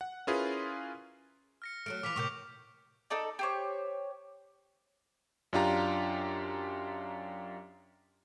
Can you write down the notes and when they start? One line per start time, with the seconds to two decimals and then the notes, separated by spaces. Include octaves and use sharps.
0.01 F#5
0.27 C#4 E4 F4 G#4 A#4 B4
1.62 F6 A#6 C#7
1.86 F#3 G#3 A3 F6 D7
2.03 E3 F3 D6 B6 F7
2.16 A2 C3 A#3 C#6 D6 G6
3.10 D#4 A4 D5
3.39 G4 C5 C#5
5.53 F#2 D4 F4 G4 A#5